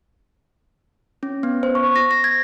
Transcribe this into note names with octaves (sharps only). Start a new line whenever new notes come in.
C#4
B3
C5
C#6
A#6
A#6
G#6